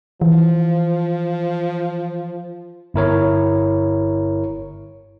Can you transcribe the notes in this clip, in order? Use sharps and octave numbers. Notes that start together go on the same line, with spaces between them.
E3 F3
G1 E4 A#4 C#5